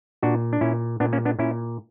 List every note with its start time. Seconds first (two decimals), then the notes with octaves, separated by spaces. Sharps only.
0.23 A#2 D4 F#4
0.53 D4
0.61 A#2 C#4 E4
1.00 A#2 B3 D4
1.13 A#3 C#4
1.25 B3 D4
1.39 A#2 C#4 E4